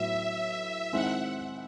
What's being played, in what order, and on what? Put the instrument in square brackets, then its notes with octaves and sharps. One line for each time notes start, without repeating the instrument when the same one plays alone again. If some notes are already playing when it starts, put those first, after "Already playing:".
Already playing: [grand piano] A2 F#3 B3 E4 [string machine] E5
[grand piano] D#3 G#3 C4 E4 [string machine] F#5